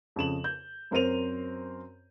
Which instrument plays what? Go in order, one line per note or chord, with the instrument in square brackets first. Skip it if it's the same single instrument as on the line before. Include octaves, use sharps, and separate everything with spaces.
[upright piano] F2 C#3 E7 F#7
G6
F#2 C4 A#4 C5 D#7 F7